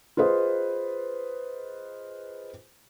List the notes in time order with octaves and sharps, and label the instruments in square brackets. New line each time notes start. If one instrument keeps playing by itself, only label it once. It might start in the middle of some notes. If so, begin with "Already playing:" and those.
[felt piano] F4 G#4 B4 C5 D#5